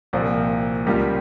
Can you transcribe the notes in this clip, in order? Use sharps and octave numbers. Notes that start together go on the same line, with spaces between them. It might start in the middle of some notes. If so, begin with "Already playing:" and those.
C2 A#2 F3 C4 F4
C#2 C#3 G3 A#3 F4